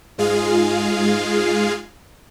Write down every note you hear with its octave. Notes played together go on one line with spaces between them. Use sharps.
G#2 G#3 F4 G#4 F5